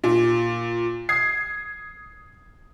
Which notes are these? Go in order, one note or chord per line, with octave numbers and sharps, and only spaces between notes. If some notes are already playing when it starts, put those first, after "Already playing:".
A#2
D#6 G#6 C7